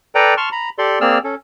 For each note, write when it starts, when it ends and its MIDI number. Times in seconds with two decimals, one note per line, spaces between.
0.15 0.34 69
0.15 0.34 71
0.15 0.34 74
0.15 0.34 79
0.15 0.34 82
0.37 0.49 81
0.37 0.49 84
0.37 0.49 85
0.37 0.49 89
0.52 0.70 82
0.52 0.70 83
0.78 0.99 67
0.78 0.99 69
0.78 0.99 74
0.78 0.99 84
1.01 1.18 58
1.01 1.18 60
1.01 1.18 68
1.01 1.18 74
1.01 1.18 88
1.01 1.18 89
1.24 1.35 61
1.24 1.35 69